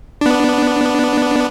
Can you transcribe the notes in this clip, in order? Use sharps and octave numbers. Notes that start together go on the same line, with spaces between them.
B3 D4